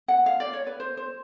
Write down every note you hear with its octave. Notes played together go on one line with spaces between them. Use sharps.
F#5
F5
D5
C#5
B4
C5
C5